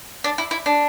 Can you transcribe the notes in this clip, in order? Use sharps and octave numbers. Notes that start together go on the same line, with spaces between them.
D4
E4
E4
D4